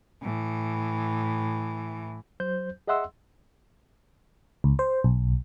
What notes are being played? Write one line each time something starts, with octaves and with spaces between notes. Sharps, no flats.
A2 E3
F#3 C5 G6
G#4 D#5 E5 F#5 C6 E6
C#2
C5
B1